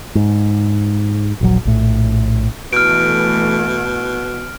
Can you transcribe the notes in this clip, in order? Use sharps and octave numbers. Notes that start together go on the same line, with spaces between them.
G#2
D#1 A#1 F#3
A#1 A2
B2 E3 A3 F6 D7